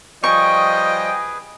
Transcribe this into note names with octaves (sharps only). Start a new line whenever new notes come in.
F3 G3 G#4 B4 D#5 G5 G#5 C#6